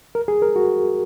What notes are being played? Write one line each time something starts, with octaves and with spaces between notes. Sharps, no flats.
A#4
G#4
A#4
F#4